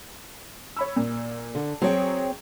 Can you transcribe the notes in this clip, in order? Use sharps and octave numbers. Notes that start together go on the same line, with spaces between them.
C#5 B5 E6
A#2
D3
F#3 C4 G#4 C#5 G5